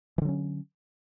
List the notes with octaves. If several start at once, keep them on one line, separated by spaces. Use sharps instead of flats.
D3 E3 F#3 C#4